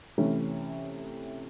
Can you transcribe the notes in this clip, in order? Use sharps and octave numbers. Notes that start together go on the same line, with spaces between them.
C3 E3 A3 C#4